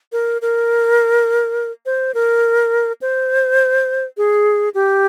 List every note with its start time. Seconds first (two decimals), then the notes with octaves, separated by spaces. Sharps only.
0.12 A#4
0.42 A#4
1.86 C5
2.14 A#4
3.02 C5
4.17 G#4
4.74 G4